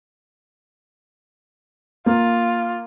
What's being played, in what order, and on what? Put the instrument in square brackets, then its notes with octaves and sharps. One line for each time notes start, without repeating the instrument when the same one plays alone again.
[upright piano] A#3 [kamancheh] F4